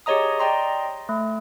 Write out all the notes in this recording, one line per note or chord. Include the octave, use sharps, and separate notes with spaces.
G4 G#4 C#5 D#5 A#5 D#6
D5 D#5 G5 A#5 C6
A3